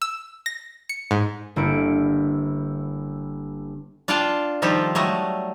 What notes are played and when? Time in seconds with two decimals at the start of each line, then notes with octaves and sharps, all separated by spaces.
0.02 E6
0.46 A#6
0.89 C#7
1.11 G#2
1.56 G1 A#3 E4 C#7 D7
4.08 D4 F4 D5 F5 G5 A5
4.62 D#3 F3 G3 F4 G4 A4
4.95 F#3 G3 A3 D#5